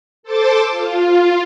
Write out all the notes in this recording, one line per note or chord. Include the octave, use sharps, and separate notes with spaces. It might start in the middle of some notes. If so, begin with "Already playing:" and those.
A4 C5 A5 D6 A6
F4